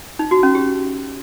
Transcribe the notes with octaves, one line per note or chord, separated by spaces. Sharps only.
D#4
F#4
C#4
G4